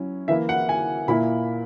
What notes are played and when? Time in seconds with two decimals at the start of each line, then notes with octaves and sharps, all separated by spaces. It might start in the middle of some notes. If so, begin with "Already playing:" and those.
Already playing: F#3 C#4 E4
0.28 E3 A#3 E4 E5
0.49 F#5
0.69 G#5
1.08 A#2 A#3 E4 B5